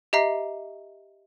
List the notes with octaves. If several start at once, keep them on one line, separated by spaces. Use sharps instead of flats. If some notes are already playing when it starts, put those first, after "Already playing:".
G4 D#5 E5 A#5 C7